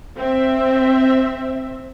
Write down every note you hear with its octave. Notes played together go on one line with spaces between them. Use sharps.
C4 E5